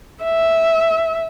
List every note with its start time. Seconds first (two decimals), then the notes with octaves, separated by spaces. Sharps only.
0.24 E5